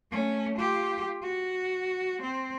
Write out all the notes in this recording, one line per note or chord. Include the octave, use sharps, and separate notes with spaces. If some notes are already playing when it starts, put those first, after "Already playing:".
A3 C#4
F4 G4
F#4
C4